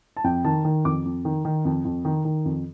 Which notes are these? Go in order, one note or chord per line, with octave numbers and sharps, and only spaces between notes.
A5
F2 G5
D#3 A5
D#3
F2 D6
F2
D#3
D#3
F2
F2
D#3
D#3
F2